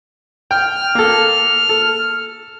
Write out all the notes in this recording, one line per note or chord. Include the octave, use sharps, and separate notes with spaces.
G5 F6
A#3 A4
A4